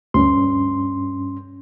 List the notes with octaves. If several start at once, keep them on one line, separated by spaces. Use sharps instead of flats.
D2 G2 C#4 C6